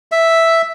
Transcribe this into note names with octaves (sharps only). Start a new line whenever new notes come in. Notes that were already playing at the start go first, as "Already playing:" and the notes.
E5